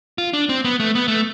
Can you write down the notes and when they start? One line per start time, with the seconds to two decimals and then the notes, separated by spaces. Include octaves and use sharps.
0.18 F4
0.33 D4
0.49 C4
0.65 B3
0.80 A3
0.95 B3
1.08 A3